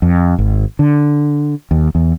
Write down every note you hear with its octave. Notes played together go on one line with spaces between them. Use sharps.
F2
G#1
D3
D#2
E2